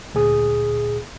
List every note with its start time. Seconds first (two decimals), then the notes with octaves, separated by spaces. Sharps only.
0.14 D2 A#2 G#4 D#6